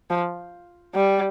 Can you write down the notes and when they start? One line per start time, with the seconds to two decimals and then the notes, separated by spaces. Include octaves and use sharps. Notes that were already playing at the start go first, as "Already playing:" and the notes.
0.10 F3
0.95 G3